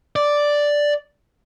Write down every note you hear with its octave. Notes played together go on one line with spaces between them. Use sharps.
D5